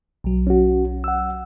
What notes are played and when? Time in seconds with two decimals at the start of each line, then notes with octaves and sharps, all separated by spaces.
0.24 B1 F#3
0.47 C#4 F#4
1.04 F#5 E6